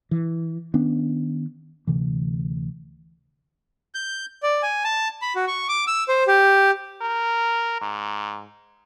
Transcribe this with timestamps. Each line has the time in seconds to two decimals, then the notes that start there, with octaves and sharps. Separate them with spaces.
0.11 E3
0.74 D#3 B3 C#4 D4
1.87 D2 C3 E3
3.95 G6
4.43 D5
4.63 G#5
4.84 A5
5.22 B5
5.36 F#4
5.47 C#6
5.68 D6
5.87 E6
6.08 C5
6.27 G4
7.01 A#4
7.81 G#2